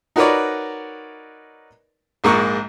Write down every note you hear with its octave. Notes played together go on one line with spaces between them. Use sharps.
D#4 F#4 A#4 B4 C#5 D5
A#1 G#2 A#3 C#6